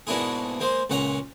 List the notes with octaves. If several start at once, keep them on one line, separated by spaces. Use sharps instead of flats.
G#2 B2 A#3 D4 E4 G#4
G#3 A#3 C5
C#2 A#2 C#4 F#5 A#5